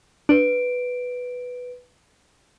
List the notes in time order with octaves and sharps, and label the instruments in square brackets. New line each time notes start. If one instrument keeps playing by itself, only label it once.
[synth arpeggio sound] D4 [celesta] B4 D7